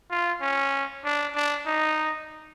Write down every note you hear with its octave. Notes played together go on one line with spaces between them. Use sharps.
F4
C#4
D4
D4
D#4